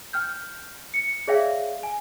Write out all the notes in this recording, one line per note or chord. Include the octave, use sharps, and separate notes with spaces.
G5 F6 G6
C#7
G#4 C#5 D5 E5 F5 G5
G#5